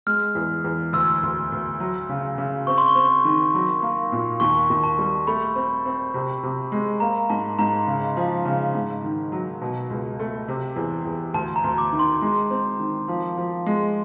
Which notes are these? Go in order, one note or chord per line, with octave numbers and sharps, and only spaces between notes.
G#3 F6
E2
E2
D2 E6
D2
D2
F#3
C#3
C#3
C4 C#6
C6
C#6
C4
D#3
F#3
A#3
A#2
D#2 C#6
D#2
A5
G3
A3 B5
C4
C4
C3
C3
G#3
A#3 A#5
G#2 A5
G#2 A#5
C#3
F3
C#3
G#2
D#3
F#3
B2
C#2
A3
C3
E2
E2
D2 A5
A#5
D2
D6
D#3
C6
G#3
C4
D#3
F3
F3
G#3